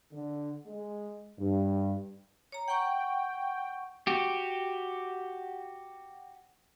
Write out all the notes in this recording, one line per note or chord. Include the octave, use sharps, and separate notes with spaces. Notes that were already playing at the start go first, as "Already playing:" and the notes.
D3
G#3
G2
C#5 A#5
F#5 G5 C#6
F#4 G4